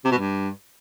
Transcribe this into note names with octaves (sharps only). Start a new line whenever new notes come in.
C3
B2
G2